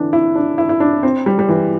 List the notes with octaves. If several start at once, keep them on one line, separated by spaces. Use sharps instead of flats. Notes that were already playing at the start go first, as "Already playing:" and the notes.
Already playing: D3 E3 D4
E4
D4
E4
E4
D4
C4
G3
G3
E3